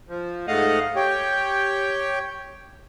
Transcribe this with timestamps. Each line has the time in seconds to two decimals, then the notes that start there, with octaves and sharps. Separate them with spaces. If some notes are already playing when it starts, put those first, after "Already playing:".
0.09 F3
0.47 G#2 A3 D#5 F5 F#5
0.96 G4 C#5 G5